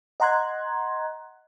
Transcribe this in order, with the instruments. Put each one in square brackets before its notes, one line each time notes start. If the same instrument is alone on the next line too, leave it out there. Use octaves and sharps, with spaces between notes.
[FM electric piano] D#5 F#5 A#5 C6 F#6 G#6